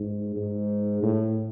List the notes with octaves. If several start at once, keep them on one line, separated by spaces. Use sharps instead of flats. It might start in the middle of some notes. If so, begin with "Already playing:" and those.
Already playing: G#2
G#2
A2